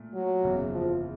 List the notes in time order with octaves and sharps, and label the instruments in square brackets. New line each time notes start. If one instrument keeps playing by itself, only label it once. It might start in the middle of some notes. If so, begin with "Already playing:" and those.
Already playing: [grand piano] A#2 A3
[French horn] F#3
[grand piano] F#1 E2 C#3
[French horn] F3